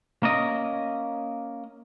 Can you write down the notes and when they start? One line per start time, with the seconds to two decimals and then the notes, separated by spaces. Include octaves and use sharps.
0.23 A#3 C#4 A#4 D#5